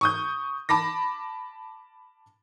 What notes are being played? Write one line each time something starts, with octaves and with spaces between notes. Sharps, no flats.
C#6 D#6 G6
A5 B5 D6 A#6